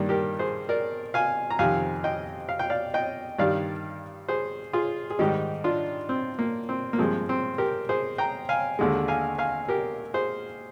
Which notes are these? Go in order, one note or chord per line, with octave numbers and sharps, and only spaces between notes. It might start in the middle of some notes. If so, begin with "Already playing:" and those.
Already playing: G2 D#3 G3 A#3 D4
G4 A#4
G#4 C5
A#4 D5
F5 G#5
A#5
F2 C3 D#3 F5 G#5
D#5 G5
F5
G5
D5 F5
D#5 G5
G2 D#3 G3 D5 F5
G#4 C5
F4 G#4
G#4
G#2 D#3 G3 D#4 G4
D4 F4
C4
A#3
C4
A#3
G2 F3 G#3 C4
C4
G4 A#4
G#4 C5
G5 A#5
F5 G#5
D#2 D3 G#3
F5 G#5
F5 G#5
G4 A#4
G#4 C5